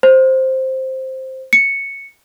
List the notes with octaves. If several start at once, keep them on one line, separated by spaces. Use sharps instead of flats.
C5
C#7